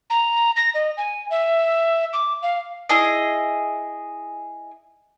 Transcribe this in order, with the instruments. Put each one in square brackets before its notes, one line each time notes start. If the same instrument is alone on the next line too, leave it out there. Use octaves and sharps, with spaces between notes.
[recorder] A#5
A#6
D#5
G#5
E5
D6
F5
[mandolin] E4 G#4 D#5